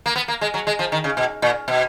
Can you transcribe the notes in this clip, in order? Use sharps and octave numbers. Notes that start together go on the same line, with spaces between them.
A#3
B3
A#3
G#3
F#3
G#3
F3
D#3
C#3
B2
A#2
B2